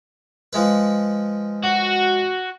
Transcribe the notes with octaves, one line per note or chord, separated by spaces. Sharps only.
F3 G#3 B4
F#4